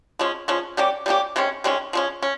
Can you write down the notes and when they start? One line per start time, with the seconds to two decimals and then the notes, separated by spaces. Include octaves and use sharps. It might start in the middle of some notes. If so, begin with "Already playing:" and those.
0.19 F3 G#3 C#4
0.48 F3 G#3 C#4
0.77 G3 A#3 C#4 G4
1.06 G3 A#3 C#4 G4
1.36 C3 D#3 G#3 C#4
1.64 C3 D#3 G#3 C#4
1.93 F3 G#3 C#4
2.23 C#4